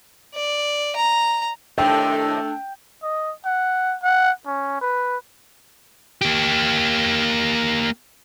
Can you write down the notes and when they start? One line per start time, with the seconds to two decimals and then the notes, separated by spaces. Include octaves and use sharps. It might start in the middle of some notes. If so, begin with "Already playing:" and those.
0.35 D5
0.96 A#5
1.78 A2 C3 D#3 A3 D4 G5
3.02 D#5
3.45 F#5
4.03 F#5
4.46 C#4
4.81 B4
6.21 A#3 G4